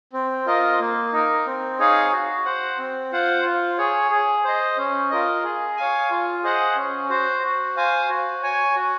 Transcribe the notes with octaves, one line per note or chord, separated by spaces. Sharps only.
C4
F4 A#4 D#5
A#3
D#4 A#4
C4
D#4 G#4 C#5 F5
F#4
C5 F#5
C4
F4 C5 F#5
F4
G#4 C#5
G#4
C5 D#5
C#4
F4 A#4 D#5
G#4
C#5 F5 G#5
F4
G#4 C5 D#5 F#5
C#4
F#4 C5
F#4
C5 F5 G#5
F#4
C#5 G#5
F#4